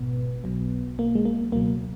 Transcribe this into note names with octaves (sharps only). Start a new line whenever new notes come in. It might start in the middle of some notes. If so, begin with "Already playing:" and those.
Already playing: G#1 G#2 B2 B3
B1 B2 F#3
A#3
G#3
A#3
C#2 B2 F#3 A#3